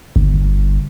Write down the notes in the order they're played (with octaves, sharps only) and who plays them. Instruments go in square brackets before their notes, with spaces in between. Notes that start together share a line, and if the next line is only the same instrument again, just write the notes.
[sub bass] G1